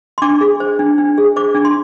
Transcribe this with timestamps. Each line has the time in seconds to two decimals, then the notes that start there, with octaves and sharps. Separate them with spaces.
0.18 C6
0.22 D4 D6
0.41 G#4
0.60 C5
0.79 D4
0.98 D4
1.18 G#4
1.36 C5 D6
1.54 D4
1.65 C6